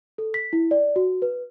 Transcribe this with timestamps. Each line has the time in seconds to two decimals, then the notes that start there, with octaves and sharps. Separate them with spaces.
0.18 A4
0.34 B6
0.53 E4
0.71 D5
0.96 F#4
1.22 B4